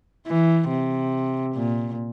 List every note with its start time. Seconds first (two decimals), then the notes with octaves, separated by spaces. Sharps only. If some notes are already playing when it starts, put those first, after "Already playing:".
0.26 E3
0.69 C3
1.55 A#2